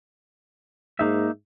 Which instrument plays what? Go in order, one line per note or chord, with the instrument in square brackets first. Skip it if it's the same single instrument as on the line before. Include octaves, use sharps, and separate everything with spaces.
[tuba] G#2 [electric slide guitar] A#3 D#4 E5